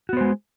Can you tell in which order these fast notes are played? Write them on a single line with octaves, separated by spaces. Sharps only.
F#4 B3 C5 G#3